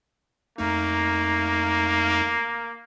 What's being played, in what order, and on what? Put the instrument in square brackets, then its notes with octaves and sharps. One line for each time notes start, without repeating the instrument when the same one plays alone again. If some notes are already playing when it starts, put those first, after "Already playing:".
[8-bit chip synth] F2 A3 D#4 [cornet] A#3